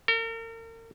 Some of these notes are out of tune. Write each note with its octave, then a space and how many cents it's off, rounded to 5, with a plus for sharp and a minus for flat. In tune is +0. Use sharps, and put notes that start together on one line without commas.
A#4 -40